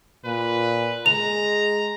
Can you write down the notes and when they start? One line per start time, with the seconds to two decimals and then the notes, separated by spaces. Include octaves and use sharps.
0.25 A#2 B4
1.06 G#3 A#5 F7